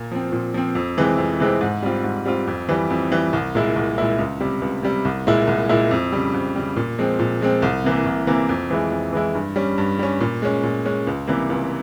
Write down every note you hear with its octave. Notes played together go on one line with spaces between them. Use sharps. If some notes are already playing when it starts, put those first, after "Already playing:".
Already playing: A#2
F3 C4
A#2
F3 C4
F2
C3 E3 G#3 C4
F2
C3 E3 G#3 C4
G#2
G3 C4 F4
G#2
G3 C4 F4
F2
E3 G3
F2
E3 G3
C2
A#2 G#3 E4
C2
A#2 G#3 E4
C#2
C3 G3
C#2
C3 G3
C2
A#2 G#3 E4
C2
A#2 G#3 E4
F2
C#3 G3
F2
C#3 G3
A#2
F3 G#3 C4
A#2
F3 G#3 C4
C2
C3 E3 A#3
C2
C3 E3 A#3
F2
E3 G#3 E4
F2
E3 G#3 E4
G2
G3 C#4
G2
G3 C#4
A#2
G#3 C#4
A#2
G#3 C#4
C#2
C3 E3 G3 A#3
C#2